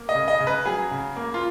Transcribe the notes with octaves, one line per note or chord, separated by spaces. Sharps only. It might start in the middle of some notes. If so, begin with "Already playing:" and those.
Already playing: A#3
D#5
C#3
D#5
C#3
B4
F#3 G#4
C#3
A#3
F4